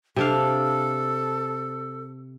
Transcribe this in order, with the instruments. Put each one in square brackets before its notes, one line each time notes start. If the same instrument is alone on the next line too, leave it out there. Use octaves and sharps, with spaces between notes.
[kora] C3 D4 F5 [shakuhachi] A4